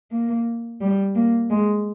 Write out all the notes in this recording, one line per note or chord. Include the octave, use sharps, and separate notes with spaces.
A#3
G3
A#3
G#3